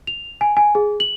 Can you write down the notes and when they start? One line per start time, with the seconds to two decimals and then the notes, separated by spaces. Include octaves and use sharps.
0.07 F7
0.41 G#5
0.57 G#5
0.75 G#4
1.00 F#7